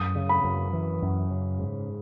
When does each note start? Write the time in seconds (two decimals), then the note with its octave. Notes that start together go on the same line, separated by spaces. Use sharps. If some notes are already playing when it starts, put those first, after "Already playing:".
Already playing: F#2 D#6
0.16 C#3
0.29 B5
0.44 F#2
0.73 E3
1.02 F#2
1.30 C#3
1.59 G#2